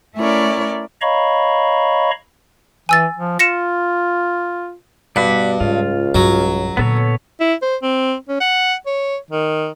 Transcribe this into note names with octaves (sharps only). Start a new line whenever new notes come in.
A3 C#4 E4 A#4 C#5 D5
C#5 D#5 F5 A#5 B5 C#6
E3 G#5 E6 A6
F3
F4 A#6 C#7 E7
G2 B2 D5 F#5 B5
C#2 G#2 F4
B1 G2 F#3
A#2 D3 B3 A4 C#5
E4
C5
C4
C#4
F#5
C#5
D#3